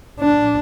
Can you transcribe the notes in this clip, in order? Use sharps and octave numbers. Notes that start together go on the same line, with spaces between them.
D4